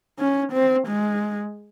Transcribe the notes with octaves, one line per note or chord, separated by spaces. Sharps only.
C#4
C4
G#3